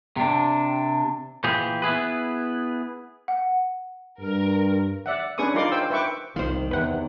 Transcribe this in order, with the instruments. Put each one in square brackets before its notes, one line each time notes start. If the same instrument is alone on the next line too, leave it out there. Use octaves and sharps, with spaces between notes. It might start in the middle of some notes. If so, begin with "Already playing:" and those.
[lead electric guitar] C3 D4
[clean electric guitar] A#2 E3 G4 G#4
B3 E4 G#4 B4
[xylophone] F#5
[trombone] G2 [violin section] A#4
[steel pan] D5 E5 F#5
C#4 D4 G#4 B4 C#6 D#6
D#4 F4 A#4 D5 C6 D6
C5 G5 E6
B4 E5 G5 C#6 D6
[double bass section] C2 [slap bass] D#3 [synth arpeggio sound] F4 C5
[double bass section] E2 [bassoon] C3 [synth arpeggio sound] B4 F#5